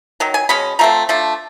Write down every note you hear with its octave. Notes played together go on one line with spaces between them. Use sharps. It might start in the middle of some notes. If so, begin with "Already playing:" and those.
D#3 F#3
G#5
B2 G#3 C#4 B5
F3 A3 C4 A#5
F3 A3 D4